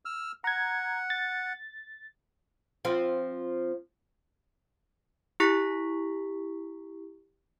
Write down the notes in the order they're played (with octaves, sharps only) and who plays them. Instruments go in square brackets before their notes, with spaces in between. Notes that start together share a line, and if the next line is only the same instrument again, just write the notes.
[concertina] E6 F6
[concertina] F#5 [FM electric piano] A#5 G#6
[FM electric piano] A6
[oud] F3 C4
[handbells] E4 G4 A#5 C#6 A#6 B6